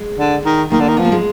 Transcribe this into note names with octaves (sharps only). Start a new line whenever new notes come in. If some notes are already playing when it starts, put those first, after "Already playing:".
Already playing: G#3
D3
D#3
D#3 A#3
D3
D#3
F3 B3
A#3
G#3